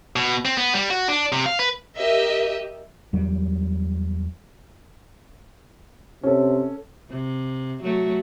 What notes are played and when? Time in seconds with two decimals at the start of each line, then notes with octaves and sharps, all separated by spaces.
0.16 B2
0.45 C4
0.57 B3
0.74 G3
0.90 F#4
1.08 D4
1.32 C3
1.46 F5
1.59 B4
1.99 G4 A#4 D#5 E5
3.13 E2 F#3 G3
6.23 C3 C#4 A4
7.10 C3
7.83 F#3 A3